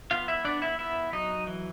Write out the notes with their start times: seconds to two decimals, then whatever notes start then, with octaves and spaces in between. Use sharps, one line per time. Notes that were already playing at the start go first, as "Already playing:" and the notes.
0.11 B3 F4 F5
0.28 E4 E5
0.45 B3 D4 D5
0.62 E4 E5
0.79 B3 E4 E5
1.12 F#3 D#4 D#5
1.47 E3